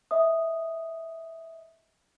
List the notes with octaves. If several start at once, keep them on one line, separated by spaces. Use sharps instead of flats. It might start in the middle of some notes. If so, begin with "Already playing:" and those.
D#5 E5 D#6